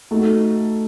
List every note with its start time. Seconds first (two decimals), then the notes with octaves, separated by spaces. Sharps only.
0.11 A3 D#4 F#4 A4